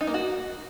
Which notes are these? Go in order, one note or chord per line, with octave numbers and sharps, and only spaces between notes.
D#4
A#3
F#4